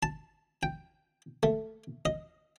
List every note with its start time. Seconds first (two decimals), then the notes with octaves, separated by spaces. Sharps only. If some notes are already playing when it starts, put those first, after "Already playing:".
0.03 A5
0.63 G5
1.43 A3
2.05 D#5